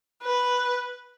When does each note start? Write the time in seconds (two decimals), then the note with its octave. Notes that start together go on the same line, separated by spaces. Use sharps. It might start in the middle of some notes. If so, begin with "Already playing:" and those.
0.23 B4